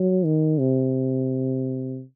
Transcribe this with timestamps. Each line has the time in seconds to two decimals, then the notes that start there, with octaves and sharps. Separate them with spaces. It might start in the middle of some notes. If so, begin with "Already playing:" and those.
Already playing: F#3
0.25 D#3
0.59 C3